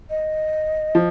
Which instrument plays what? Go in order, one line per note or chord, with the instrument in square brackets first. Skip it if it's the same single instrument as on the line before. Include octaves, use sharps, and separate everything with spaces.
[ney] D#5
[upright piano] F3